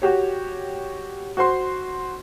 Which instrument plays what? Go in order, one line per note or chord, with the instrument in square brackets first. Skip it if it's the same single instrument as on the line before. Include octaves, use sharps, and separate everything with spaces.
[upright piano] F#4 G4 C#5
F#4 C5 C6